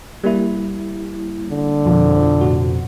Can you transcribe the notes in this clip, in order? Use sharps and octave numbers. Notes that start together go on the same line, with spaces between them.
G3 A#3 E4
D3
F2 B2 F3
A2 F#4